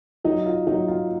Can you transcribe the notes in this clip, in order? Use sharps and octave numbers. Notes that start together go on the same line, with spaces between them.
F#3 D#4
F4
F#3 D#4
F4